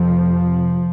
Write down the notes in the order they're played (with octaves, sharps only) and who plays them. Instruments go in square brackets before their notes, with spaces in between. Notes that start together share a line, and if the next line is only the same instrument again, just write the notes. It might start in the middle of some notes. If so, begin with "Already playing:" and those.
Already playing: [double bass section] F2 C3 F3